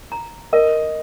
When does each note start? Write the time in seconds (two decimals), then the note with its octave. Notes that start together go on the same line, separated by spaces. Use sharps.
0.12 A#5
0.53 A#4 D#5